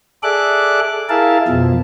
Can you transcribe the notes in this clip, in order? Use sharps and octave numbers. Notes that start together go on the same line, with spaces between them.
G#4 A4 D5 E5 D6 F#6
E4 G#4 A#4 E5 F5 A5
F2 B2 F3